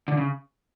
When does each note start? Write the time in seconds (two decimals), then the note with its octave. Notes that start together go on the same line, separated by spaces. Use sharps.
0.08 D3
0.17 C#3